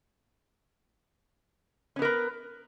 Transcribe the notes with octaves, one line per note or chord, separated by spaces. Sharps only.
B3 C#4 A#4 B4